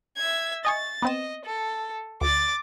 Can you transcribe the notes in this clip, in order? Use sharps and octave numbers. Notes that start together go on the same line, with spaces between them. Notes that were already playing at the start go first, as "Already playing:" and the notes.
E5 G#6
D#5 G#5 C#6 A6
B3 C4 D#5 E7
A4
D2 D6 A6